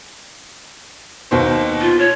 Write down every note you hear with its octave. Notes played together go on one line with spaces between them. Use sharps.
D#2 B2 C5
F4
C#5